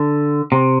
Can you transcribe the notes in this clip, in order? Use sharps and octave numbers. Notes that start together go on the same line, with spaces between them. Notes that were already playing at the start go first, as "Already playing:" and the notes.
Already playing: D3
C3